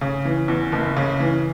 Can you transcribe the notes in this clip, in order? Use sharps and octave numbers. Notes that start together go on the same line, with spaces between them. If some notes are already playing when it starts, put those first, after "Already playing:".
C#3
E3
E2
F#1
C#3
E3